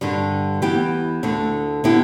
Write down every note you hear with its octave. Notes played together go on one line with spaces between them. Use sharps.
G2 D3 G3
E2 E3 B3 G4
D2 D3 A3
D3 B3 E4 G4